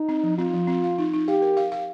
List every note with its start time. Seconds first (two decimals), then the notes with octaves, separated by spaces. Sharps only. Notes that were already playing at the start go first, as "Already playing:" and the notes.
Already playing: D#4
0.09 C4
0.23 F3
0.38 C4 F4
0.54 F3
0.68 C4
0.84 F5
0.98 D#4
1.13 D#4
1.28 G4 F5
1.42 A#4
1.57 F5
1.72 F5